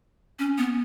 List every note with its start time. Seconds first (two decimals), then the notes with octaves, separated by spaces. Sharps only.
0.39 C#4
0.58 B3